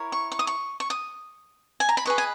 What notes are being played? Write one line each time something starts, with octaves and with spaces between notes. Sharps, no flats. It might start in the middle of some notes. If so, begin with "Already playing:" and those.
Already playing: E4 A#4 C#5
C#6
C#6
D#6
C#6
C#6
D#6
G#5
A#5
B5
G#4 B4 D#5 C#6
G#5